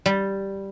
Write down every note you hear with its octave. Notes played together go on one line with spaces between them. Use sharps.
G3